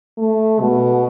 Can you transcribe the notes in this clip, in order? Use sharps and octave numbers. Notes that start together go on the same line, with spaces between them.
A3
B2